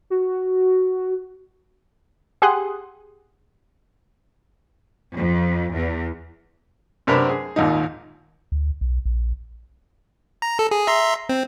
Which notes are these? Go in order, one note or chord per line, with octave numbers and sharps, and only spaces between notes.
F#4
G4 G#4 F#5 C6 D#6 F#6
F2
E2
F#2 C3 D4 A#4 B4 B5
G#4
G#1 D#2 A#2 D#4
D2
B1
A#1
A#5
A4
G#4
E5 A#5 C6
C4